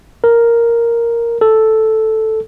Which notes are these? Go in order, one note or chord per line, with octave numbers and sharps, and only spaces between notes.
A#4
A4